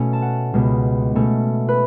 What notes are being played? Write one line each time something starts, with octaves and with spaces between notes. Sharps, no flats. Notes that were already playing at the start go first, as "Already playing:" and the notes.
Already playing: B2 A3 C#4
A5
F#5
C#2 B2 B3
B2 A3 C#4
B4